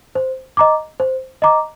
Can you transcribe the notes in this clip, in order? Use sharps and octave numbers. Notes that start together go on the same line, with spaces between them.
C5
D#5 A#5 D6
C5
D#5 A#5 D6